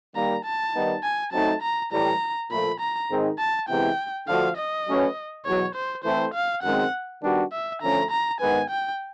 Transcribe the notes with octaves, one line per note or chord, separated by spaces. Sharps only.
D#3 G3 A#3 A#5
A5
D#3 G3 B3 D#4
G#5
F#3 A3 C4 D#4 A5
A#5
A2 E3 G3 A#5
A#2 F3 A3 B5
A#5
G#2 D#3 G#3 C4 D#4
A5
C3 E3 G#3 B3 E4 G5
D3 F3 A3 D4 F#4 F5
D#5
F#3 A3 C#4 F#4 B4
E2 B2 F#3 C#5
C5
E3 A3 C4 E4 A4 C5
F5
F#2 D#3 G#3 C4 F#5
D#3 G3 B3 D4 F#4
E5
D3 F3 A3 C#4 A#5
A#5
G#2 D#3 G#3 B3 G#5
G5